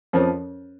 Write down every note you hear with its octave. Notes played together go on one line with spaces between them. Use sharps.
F2 F3 C#4 A#4 C#5